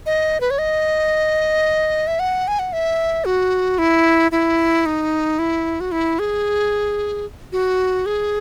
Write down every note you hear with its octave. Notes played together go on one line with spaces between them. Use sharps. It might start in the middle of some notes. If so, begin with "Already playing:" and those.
D#5
B4
C#5
D#5
E5
F#5
G#5
F#5
E5
F#4
E4
E4
D#4
E4
F#4
E4
G#4
F#4
G#4